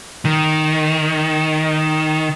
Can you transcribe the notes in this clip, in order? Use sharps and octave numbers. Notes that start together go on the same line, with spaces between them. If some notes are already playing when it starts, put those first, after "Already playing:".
D#3